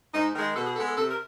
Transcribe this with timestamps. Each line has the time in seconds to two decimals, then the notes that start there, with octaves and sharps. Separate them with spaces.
0.13 G#2 D#4
0.35 D#3 G#3
0.55 B2 A4
0.65 G#4
0.76 G#3 B3 A4
0.86 A4
0.96 C3 A4
1.11 A#4